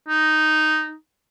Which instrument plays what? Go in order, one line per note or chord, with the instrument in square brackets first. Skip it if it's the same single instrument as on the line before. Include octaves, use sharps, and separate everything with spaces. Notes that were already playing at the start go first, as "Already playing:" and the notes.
[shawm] D#4